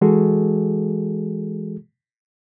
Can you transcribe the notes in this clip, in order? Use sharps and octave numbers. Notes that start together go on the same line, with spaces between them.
E3 G#3 F#4 G#4 A4